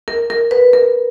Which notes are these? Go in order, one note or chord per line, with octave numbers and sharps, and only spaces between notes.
A#4
A#4
B4
A#4